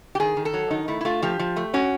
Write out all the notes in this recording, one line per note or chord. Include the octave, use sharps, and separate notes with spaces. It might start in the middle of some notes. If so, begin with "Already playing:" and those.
G4
D#3 G#4
D#3
A4
F#3
D#3 D#4
A3 E4
E4
A3 F4
F3 G4
F3
A3
C#4 F#4